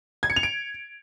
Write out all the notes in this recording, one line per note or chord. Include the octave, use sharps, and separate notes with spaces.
G#6
C#7
F7
D7